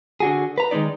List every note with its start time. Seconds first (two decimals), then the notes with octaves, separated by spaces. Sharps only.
0.20 D3 F#4 G#4
0.58 B4 A#5
0.71 D#3 G#3 C4 D#4 D5